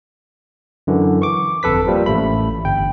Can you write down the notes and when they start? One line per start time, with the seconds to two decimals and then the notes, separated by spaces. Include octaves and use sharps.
0.87 F#2 D3 E3
1.22 C#6 D6
1.63 G1 F2 A4 B4 B6
1.87 F3 G3 A#3
2.06 A1 A3 B5
2.65 G1 G5